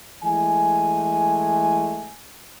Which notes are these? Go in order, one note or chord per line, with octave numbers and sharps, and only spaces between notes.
E3 G#3 A3 G#5